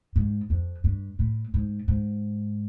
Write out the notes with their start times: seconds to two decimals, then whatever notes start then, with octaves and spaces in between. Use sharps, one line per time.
0.16 G#2
0.50 F2
0.84 G2
1.19 A2
1.54 G#2
1.88 G#2